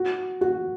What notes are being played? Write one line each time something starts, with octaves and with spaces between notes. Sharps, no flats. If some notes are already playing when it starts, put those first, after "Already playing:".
Already playing: F#4
F#4